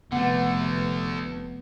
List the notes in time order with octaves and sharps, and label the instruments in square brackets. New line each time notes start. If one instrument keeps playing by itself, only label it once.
[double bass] F1 [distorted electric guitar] D3 A3 [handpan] B3 [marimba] F#5